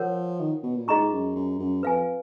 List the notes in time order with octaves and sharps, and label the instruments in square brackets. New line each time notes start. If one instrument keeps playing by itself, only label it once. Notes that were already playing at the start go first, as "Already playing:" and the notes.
Already playing: [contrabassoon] F3 [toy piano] A#4 C#5 F#5
[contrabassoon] D#3
B2
A#2
[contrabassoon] G#2 [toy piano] F4 G#4 D#5 A#5 C#6
[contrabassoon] F#2
F#2
F#2
[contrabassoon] F2 [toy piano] B4 F5 G#5